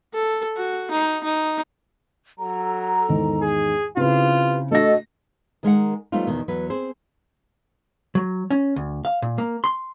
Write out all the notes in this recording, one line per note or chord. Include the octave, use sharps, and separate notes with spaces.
A4
F#4
D#4
D#4
F#3 A4 A#5
E2 G#2 D#3
G#4
C#3 C4 E4 F4 G4 B4
A3 D4 F#4 A4 D#5 A#6
D#3 G#3 A#4 F#5
F3 G3 A3 B3 D#4 F4
E2 B2 D#3
E2 F#3 B4
C4 G#4 C5
F#3
C#4
D2
F5
A#2
A#3
C6